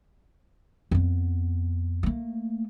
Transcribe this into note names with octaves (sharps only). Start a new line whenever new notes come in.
F2 B3
A3 A#3